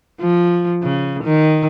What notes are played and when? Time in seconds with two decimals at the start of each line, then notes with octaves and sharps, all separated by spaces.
0.21 F3
0.83 C#3
1.24 D#3